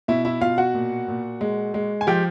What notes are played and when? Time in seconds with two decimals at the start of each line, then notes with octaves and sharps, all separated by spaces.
0.08 B2 E4 E5
0.25 E4 E5
0.41 B2 F4 F5
0.58 F#4 F#5
0.74 A#2
1.08 A#2
1.41 G#3
1.74 G#3
2.01 G#5
2.07 F3 G4 G5